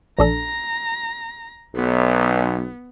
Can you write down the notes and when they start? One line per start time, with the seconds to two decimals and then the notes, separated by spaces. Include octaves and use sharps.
0.19 A#1 D4 A4 A#5
1.76 B1 B3